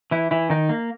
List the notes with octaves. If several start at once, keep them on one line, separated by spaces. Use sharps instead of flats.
E3 E4
E3 E4
D#3 D#4
A#3